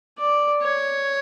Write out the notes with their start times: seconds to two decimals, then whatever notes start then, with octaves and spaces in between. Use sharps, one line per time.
0.18 D5
0.62 C#5